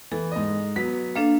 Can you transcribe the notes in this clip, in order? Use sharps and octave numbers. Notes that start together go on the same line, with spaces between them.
E3 A4
G#2 D#5
F#3 B3 B6
A#3 D4 A4 F5